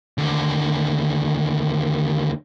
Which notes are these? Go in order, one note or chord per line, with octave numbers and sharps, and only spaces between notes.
D#2 D3